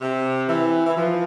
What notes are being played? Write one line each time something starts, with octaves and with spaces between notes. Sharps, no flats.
C3
E3
E3
F3